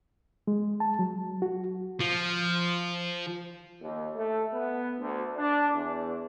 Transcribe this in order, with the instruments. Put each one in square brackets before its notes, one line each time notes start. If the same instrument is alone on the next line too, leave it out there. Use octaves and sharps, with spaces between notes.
[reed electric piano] G#3
A5
F#3
F#4
[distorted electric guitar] F3
[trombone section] D#2
A3
B3
D2
D4
E2